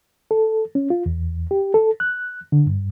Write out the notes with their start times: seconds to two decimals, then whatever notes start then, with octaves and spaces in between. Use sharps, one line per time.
0.31 A4
0.75 C#4
0.90 F4
1.06 E2
1.51 G4
1.74 A4
2.00 F#6
2.52 D3
2.66 G2